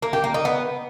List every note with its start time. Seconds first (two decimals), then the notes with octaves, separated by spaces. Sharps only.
0.02 A#3
0.13 G4
0.24 A#3
0.34 D#4
0.45 B3